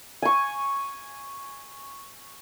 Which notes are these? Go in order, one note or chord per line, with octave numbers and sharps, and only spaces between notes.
G#5 C#6